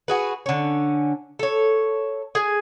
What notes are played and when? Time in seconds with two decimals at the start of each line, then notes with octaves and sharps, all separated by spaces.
0.08 F#4 G#4 B4
0.46 D3 C#4
1.39 A4 C#5
2.35 G#4 G#5